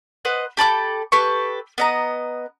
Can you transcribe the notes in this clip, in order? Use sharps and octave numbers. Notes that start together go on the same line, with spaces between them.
B4 C5 D#5 F#5
G4 A4 B5 D6
G4 A4 B4 C#6
B3 D#5 A#5